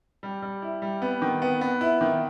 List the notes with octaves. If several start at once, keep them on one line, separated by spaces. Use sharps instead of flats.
G3
G3
E4
G3
B3
D#3
B3
B3
E4
D#3